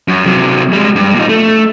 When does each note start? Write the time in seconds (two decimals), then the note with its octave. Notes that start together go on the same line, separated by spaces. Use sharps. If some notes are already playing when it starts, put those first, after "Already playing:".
0.08 F#2
0.26 C3 F#3
0.73 G3 G#3
0.96 G2
1.15 A#2 D#4
1.29 A3